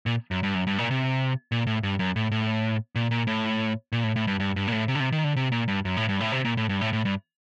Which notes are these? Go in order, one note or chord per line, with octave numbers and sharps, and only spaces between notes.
A#2
F#2
G2
F#2
G2
A#2
C3
A#2
A2
G2
F#2
A2
A2
A#2
A#2
A2
A#2
A2
A2
G2
G2
G2
A#2
A2
C3
D3
C3
D#3
D3
C3
A#2
G2
F#2
A2
G2
A2
C3
A#2
A2
G2
A2
A2
G2